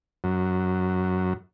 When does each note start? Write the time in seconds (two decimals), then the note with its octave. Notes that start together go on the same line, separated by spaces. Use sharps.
0.24 F#2